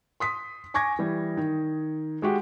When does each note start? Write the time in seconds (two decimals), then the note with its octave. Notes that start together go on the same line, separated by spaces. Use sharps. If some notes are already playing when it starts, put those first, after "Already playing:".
0.20 C6 D#6 B6
0.74 G#5 C#6 D6 G#6 A#6
0.99 E3 G3
1.37 D#3
2.22 G#3 F#4 G4